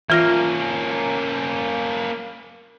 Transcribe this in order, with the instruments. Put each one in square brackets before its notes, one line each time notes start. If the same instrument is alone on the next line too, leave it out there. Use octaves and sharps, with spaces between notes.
[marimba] E3 F4 A#6 [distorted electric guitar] A#3 C#4